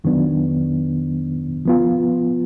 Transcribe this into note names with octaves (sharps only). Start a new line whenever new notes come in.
F2 D#3 F#3 B3 D4
F3 B3 F4